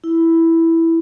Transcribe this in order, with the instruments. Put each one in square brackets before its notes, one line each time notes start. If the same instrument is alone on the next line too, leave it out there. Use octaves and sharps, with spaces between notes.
[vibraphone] E4